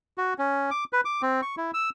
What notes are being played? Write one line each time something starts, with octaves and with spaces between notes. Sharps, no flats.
F#4
C#4
D6
B4
D6
C4
C#6
E4
E6